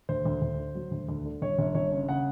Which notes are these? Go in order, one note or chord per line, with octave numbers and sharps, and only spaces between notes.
D2 C5
D2
D2
D3
F#3
D2
D2
D3
G1 C#5
G1
G1 C#5
C#3
C#3 F#5